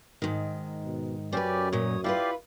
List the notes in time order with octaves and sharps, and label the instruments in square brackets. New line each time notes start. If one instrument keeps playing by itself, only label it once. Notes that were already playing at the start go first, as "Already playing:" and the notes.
[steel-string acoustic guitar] G#2 D#3
[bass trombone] B2
[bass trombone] F#2 [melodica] C#4 G4 D5 [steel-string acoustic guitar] B4 C5
[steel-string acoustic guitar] A#2 F#3 [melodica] C#5 D#6
[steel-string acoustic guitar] E4 F4 B4 [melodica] G4 D5 F5